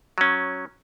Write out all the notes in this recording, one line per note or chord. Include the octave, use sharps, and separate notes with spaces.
F#3 C#4